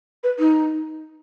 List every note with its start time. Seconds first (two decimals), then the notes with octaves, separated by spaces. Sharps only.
0.23 B4
0.39 D#4